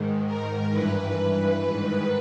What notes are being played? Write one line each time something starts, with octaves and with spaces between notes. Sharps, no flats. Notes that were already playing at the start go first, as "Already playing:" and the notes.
Already playing: G#2 D#3
A#4
G2 E3 B4
G#2 D#3